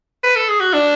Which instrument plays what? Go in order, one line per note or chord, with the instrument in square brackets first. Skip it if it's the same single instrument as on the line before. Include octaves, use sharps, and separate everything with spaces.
[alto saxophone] B4
A4
G#4
F#4
D4